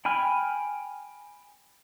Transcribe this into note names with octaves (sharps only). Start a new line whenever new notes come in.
G5 G#5 B5 F6